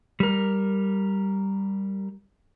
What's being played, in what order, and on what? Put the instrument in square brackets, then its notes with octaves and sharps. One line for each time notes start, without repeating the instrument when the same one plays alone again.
[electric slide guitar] G3 A#4